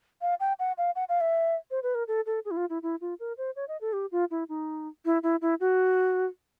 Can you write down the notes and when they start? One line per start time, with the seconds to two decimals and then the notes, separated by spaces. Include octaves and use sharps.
0.21 F5
0.40 G5
0.59 F#5
0.78 F5
0.96 F#5
1.09 F5
1.21 E5
1.71 C5
1.83 B4
1.95 A#4
2.08 A4
2.26 A4
2.45 G#4
2.51 E4
2.57 F4
2.70 E4
2.83 E4
3.01 F4
3.20 A#4
3.38 C5
3.56 C#5
3.68 D#5
3.81 A4
3.93 G4
4.12 F4
4.31 E4
4.49 D#4
5.05 E4
5.23 E4
5.42 E4
5.60 F#4